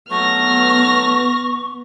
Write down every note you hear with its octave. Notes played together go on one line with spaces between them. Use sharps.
F#3 A3 B3 C#6 F6 A#6